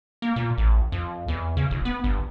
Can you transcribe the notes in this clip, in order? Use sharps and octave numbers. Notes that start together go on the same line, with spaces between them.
A#3
A#2
A1
F2
E2
C#3
F1
B3
G1